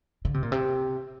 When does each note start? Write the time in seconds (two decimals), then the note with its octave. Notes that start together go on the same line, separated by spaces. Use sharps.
0.25 D3
0.34 C3
0.43 A#2
0.52 C3